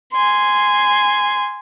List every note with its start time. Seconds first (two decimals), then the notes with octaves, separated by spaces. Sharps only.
0.13 G#5 C6